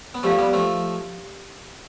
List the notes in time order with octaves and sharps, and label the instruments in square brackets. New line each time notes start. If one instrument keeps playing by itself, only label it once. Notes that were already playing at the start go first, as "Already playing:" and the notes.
[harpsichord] B3
[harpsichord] F3 A3 [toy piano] G4 D5 F5
[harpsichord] G3 B3
F3 A3